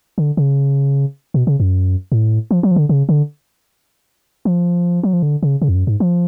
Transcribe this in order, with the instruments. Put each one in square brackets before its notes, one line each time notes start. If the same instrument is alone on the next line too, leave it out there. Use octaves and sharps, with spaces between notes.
[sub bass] D3
C#3
B2
C#3
F#2
A2
F3
F#3
F3
D3
C#3
D3
F3
F#3
F3
D3
C#3
C#3
F2
F#2
G#2
F3